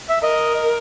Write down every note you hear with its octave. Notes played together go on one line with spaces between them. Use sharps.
E5
A#4 D#5